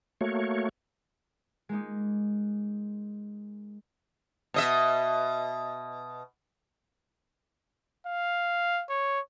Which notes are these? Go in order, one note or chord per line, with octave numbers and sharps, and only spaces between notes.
A3 A#3 F#4 C#5
G#3 A#3 D#4
B2 D#5 E5
F5
C#5